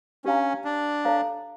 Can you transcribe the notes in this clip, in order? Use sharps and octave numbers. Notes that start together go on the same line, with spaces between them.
C#4 D4 G4 C#5 F5 A#5
D4
A4 C#5 F5 A#5